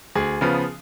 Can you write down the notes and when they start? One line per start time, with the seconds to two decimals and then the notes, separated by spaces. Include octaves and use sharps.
0.16 D2 G#4
0.41 C#3 F3 B3